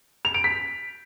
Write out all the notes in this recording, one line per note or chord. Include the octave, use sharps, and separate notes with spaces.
F7
D7
B6